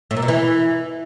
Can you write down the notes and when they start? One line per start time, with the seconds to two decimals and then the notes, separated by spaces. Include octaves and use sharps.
0.11 A2
0.17 A#2
0.22 B2
0.28 E3